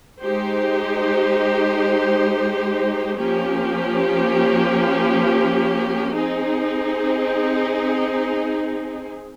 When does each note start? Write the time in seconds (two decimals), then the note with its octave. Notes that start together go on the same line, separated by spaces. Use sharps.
0.21 G#3 D#4 G4 C5
3.18 F3 A#3 C#4 G4
6.15 C4 D#4 G#4